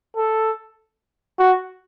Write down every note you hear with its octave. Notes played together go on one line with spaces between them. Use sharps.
A4
F#4